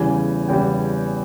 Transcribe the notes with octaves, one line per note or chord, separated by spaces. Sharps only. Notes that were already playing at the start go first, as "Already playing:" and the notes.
Already playing: E2 C#3 E3 G3 G#5
E2 C#3 E3 G3 G5